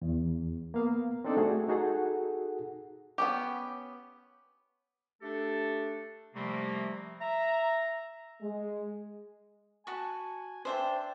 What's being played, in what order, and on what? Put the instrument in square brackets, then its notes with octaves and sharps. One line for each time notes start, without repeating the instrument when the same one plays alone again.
[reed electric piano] E2
A#3 B3 F5
C4 D4 D#4 A4 C5 D5
A3 F#4 G#4
D#4 F#4 G#4 A4 F#5
[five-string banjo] B3 C#4 G4
[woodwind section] A3 D4 G4 A4
C3 F3 G3 A3 A#3 C4
E5 A#5
[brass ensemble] G#3
[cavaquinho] F#4 A5 C#6 [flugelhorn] G#5
[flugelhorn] D4 [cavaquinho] C5 E5 G5